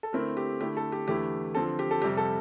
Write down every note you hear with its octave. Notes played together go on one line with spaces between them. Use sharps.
A4
D3 A3 C4 E4 A#4
G4
D3 A3 E4 G4
A4
G4
E2 D3 A3 E4 G4
D3 F3 C4 A4
G4
A4
F2 C3 G3 G4
A4